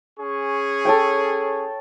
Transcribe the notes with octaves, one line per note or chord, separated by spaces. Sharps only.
C#4 G#4 C#6
A4 C#5 G5